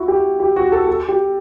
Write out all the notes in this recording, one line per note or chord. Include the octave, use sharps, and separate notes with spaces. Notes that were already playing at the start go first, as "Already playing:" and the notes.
Already playing: E4 F#4
G4
G4
F#4
A4
A4
G4